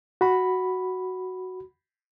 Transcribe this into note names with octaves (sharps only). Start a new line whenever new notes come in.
F#4 B5